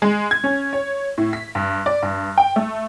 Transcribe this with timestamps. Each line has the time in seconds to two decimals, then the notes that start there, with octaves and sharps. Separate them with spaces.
0.02 G#3
0.31 G#6
0.44 C#4
0.73 C#5
1.18 A2
1.33 B6
1.55 G2
1.86 D5
2.02 G2
2.38 G5
2.56 A3